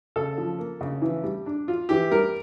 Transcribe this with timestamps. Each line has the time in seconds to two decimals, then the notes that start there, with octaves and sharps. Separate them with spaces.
0.16 C#3 A4
0.38 F3
0.59 A#3
0.81 C#3
1.02 E3
1.23 G3
1.46 D4
1.68 F4
1.89 E3 G4
2.11 G3 A#4